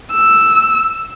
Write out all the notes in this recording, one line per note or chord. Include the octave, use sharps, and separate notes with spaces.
E6